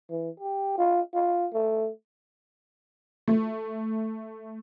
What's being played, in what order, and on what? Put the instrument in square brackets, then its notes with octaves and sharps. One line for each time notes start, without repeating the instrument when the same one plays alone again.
[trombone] E3
G4
F4
F4
A3
[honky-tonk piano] A3